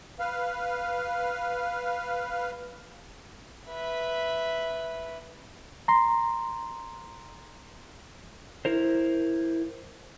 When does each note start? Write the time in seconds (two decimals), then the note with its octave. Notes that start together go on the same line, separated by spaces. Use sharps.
0.19 B4 F5
3.68 B4 E5
5.88 A#5 C6
8.65 E4 A#4 C5